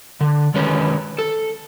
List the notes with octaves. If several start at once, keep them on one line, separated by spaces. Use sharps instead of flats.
D3
D#3 G#3 C#4 B4
A4